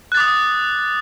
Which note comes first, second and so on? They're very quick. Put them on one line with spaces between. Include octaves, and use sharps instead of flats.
F#6 A6 D6 D#6